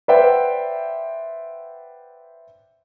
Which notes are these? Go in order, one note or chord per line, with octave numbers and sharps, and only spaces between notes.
B4 C5 D5 E5 F#5 G5